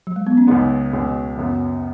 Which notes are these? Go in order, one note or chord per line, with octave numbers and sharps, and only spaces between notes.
F#3
G#3
B3
C#4
C#2 C#3 G#3 B3 D#4
C#2 B2 G#3 C#4 G#4
F#2 C#3 B3